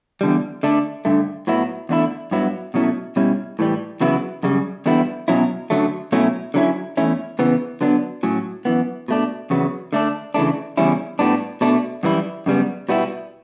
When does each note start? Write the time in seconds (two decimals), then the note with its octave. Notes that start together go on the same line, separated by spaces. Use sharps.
0.21 E2 D3 G3
0.63 D3 A3 D4
1.05 G2 D3 A3
1.47 A2 F#3 B3 E4
1.89 E2 D3 A3 E4
2.31 G2 F#3 B3 E4
2.74 B2 F#3 A3 C#4 E4
3.16 B2 G3 C#4 E4
3.59 A2 E3 G3
4.01 E2 C#3 F#3 B3 E4
4.43 F#2 C#3 G3
4.86 E2 D3 G3 B3 E4
5.28 B2 F#3 C#4 E4
5.70 F#2 D3 F#3 A3
6.12 B2 F#3 A3 C#4 E4
6.54 D3 F#3 C#4 E4
6.97 E2 B2 A3 C#4 E4
7.39 C#3 E3 B3
7.81 D3 F#3 B3 D4
8.23 A2 F#3 C#4
8.65 F#2 E3 B3
9.08 B2 A3 D4
9.50 E2 C#3 F#3 B3
9.93 D3 A3 D4
10.34 C#3 E3 A3 D4
10.77 E2 C#3 G3 C#4 E4
11.19 A2 G3 B3 D4
11.61 B2 A3 D4
12.03 F#2 E3 G3 E4
12.46 F#2 C#3 G3 B3
12.89 B2 G3 B3 E4